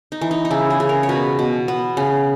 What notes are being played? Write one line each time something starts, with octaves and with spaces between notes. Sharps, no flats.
D#4
E3
D#4
D#4
C#3 E4
G#4
C#3
A#4
C#5
B2 B4
B2
B3
C#3